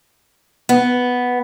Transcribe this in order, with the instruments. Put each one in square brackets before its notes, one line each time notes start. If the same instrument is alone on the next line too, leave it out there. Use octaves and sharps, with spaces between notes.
[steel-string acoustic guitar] B3